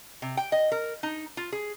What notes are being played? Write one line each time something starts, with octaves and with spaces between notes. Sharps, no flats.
C3
G5
D#5
A#4
D#4
F4
G#4